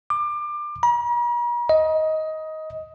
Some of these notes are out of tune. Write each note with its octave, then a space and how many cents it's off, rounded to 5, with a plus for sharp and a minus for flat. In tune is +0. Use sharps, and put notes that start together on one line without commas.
D6 +25
A#5 +45
D#5 +15